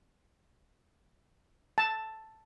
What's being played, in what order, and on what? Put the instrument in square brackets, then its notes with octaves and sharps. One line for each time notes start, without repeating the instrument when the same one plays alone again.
[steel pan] A5